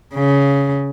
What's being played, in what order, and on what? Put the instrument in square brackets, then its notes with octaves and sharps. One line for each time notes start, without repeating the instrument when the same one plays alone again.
[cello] C#3